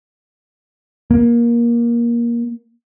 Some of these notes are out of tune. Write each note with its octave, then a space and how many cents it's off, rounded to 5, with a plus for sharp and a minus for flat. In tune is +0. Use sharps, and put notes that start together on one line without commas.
A#3 +20